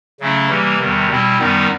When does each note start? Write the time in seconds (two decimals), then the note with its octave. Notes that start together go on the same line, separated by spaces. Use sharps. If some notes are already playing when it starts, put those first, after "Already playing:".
0.20 C#3 F#3 A3 C#4 E4
0.49 C3 E3 G3 A#3
0.79 E2 C3 D#3 G3
1.09 B2 G3 C4 E4
1.38 F#2 D#3 G3 B3 D#4